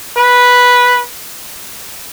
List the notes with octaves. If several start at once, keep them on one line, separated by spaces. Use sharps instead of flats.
B4